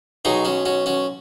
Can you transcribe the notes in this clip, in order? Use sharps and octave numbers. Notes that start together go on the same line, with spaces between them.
B1 B2 F#3 D#4 G#4
C#4 F#4
C#4 F#4
C#4 F#4